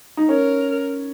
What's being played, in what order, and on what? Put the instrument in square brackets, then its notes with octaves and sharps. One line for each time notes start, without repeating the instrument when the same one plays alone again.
[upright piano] D#4
[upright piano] C#4 [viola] A#4